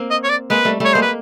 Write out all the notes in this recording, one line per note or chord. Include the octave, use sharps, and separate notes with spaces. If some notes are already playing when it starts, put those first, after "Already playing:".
Already playing: A#3 C4
D#5
C#5
D5
G#3 A#3 B4
G3 A3
G3 A3 C#5
G#3 A#3 C5
B4